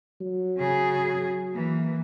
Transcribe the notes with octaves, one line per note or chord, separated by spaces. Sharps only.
F#3
C#3 G#4
E3 A#3